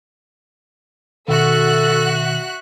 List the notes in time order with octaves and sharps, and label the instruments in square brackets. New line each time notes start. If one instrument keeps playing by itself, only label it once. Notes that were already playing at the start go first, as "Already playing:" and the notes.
[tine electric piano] B2 D#3 [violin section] F#4 E5 F#6 [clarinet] A4